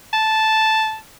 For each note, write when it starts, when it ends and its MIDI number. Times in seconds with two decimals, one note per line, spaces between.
0.13 0.96 81